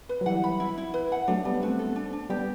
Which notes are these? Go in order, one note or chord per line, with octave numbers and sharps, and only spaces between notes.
B4
F#3
E3 G3 F#5
B5
E4
E4
B4
F#5
F#3 A3 D4
G3 B3 D4
A3 C4 F#4
A4
D4
D4
G3 B3 G4